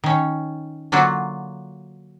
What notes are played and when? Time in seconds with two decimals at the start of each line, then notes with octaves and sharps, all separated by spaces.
0.04 D#3 C#4
0.92 D3 F#3 A#3 F4 F#4